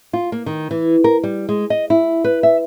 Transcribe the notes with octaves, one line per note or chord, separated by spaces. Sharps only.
F4
A#3
D#3
E3
A#4
G3
G#3
D#5
E4
B4
E5